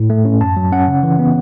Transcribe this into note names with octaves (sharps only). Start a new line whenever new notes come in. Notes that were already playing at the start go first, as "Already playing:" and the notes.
Already playing: A2
A3
C#4
F#2 A5
F#3
C#4 F#5
C#3
E3
B3